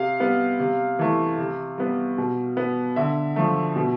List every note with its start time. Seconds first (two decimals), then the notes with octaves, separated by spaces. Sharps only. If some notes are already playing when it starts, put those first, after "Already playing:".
Already playing: C3 F5
0.20 G3 B3
0.60 C3
0.99 E3 A3
1.38 C3
1.78 G3 B3
2.18 B2
2.57 B3
2.96 D3 E5
3.36 F3 A3
3.76 B2